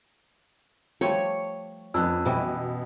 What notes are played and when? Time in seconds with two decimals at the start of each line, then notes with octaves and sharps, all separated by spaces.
1.01 F3 G3 A3 C#5
1.94 F2 B3 C#4 D4 E6 F#6
2.25 B2 E3 G3 E4